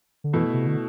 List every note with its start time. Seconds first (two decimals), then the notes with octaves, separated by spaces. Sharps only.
0.24 D3
0.33 B2 E3 A3 E4
0.54 C3
0.67 D3